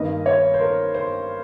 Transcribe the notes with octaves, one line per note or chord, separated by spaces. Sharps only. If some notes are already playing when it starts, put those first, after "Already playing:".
Already playing: G2 D#3 A#3 D#5
C#5
C5
A#4
C5